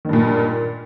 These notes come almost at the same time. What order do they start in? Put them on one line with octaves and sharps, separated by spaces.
D#3 G2 A#2